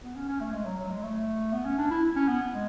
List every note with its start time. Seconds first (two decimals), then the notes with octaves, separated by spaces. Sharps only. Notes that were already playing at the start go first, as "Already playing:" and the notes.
0.03 B3
0.16 C#4
0.28 C#4
0.40 A3
0.53 G#3
0.65 F#3
0.78 F#3
0.90 G#3
1.03 A3
1.53 B3
1.65 C#4
1.78 D4
1.91 E4
2.16 C#4
2.28 B3
2.54 G#3